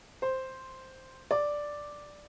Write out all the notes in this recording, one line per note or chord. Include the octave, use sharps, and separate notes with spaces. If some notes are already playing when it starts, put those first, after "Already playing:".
C5
D5